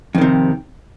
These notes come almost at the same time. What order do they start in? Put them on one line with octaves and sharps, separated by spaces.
F2 D#3 C3